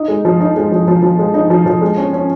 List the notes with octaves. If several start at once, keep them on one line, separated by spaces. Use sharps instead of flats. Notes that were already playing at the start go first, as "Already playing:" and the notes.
Already playing: D#4
G#3
F3
D#4
G#3
F3
F3
F3
G#3
D#4
F3
F3
G#3
C#4
C#4